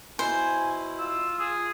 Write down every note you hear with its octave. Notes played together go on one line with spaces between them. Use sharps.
B2 E4 C5 G#5
F4 E6
G#4